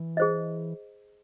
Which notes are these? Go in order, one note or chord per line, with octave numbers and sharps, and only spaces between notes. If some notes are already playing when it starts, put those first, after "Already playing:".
Already playing: E3
G#4 C5 D#5